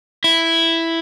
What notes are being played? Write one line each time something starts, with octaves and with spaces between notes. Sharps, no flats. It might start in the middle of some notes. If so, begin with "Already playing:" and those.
E4